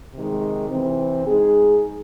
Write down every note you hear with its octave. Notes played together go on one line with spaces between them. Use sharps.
C3 D#3 G#3
C3 E3 C4
G#3 D#4 G#4